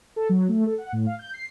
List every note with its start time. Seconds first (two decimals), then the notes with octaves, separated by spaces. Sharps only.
0.16 A4
0.29 F#3
0.49 A3
0.67 A4
0.78 F#5
0.92 A2
1.06 F5
1.19 G6
1.34 C7